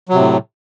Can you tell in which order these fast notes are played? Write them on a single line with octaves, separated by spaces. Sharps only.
F#3 C3 A2